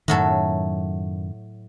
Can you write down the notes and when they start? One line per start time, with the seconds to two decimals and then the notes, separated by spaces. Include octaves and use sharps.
0.08 F#2 A2 D#3 F#3 A4